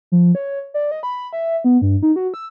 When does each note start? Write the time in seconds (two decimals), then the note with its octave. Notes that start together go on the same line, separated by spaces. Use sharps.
0.12 F3
0.35 C#5
0.74 D5
0.91 D#5
1.03 B5
1.33 E5
1.64 B3
1.82 G2
2.03 D#4
2.16 F#4
2.34 E6